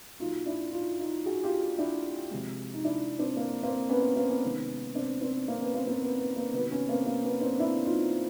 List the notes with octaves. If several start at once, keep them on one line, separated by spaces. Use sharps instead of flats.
A#2 F#3 D#4 F4
D4 E4
D#4 F4
D#4 F4
F#4 G#4
F4 G4
D4 E4
C3 F3 G#3
D#4
D4 E4
C4 D4
A#3
A#3 C4
B3 C#4
B3
A#3 C4
B3 C#4
C3 D#3 G#3
C4 D4
C4 D4
A#3 C4
B3 C#4
A#3 C4
A#3 C4
B3
B3
A#3
C3 D#3 F#3 B3
B3 C#4
A#3 C4
A#3 C4
B3 C#4
C4 D4
D4 E4
D#4 F4